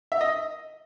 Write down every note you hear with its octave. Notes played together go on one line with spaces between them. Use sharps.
E5
D#5